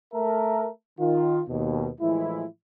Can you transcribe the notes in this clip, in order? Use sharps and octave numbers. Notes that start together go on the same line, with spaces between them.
A3 A#4 E5 A5
D#3 F4
D#2 B2
A2 E3 F3 G#3 E4